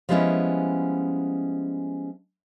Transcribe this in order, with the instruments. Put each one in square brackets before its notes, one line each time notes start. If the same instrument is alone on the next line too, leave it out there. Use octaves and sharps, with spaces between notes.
[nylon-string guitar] F3 G3 G#3 B3 C#4 E4